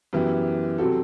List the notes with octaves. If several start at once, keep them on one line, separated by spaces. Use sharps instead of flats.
F#2 E3 B3 E4 G4
C3 F#3 C4 F#4 A4